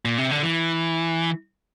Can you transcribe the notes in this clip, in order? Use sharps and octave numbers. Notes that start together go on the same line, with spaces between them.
A#2
C3
D3
E3